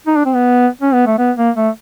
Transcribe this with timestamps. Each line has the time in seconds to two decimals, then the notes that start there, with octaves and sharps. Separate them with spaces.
0.07 D#4
0.16 D4
0.25 C4
0.35 B3
0.82 C#4
0.93 B3
1.06 A3
1.19 B3
1.37 A#3
1.56 A3